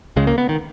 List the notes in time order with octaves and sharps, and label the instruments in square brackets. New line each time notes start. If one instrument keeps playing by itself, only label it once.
[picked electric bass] C#2 C#3 G#3
A#3
B3
D#3